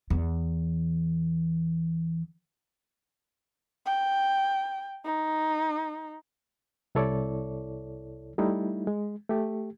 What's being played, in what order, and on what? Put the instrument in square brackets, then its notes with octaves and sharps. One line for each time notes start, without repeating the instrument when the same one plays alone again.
[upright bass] E2 E3
[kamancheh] G5
D#4
[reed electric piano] C2 E4 A4 C#5 D5
G3 A3 D#4 E4
G#3
A3 G4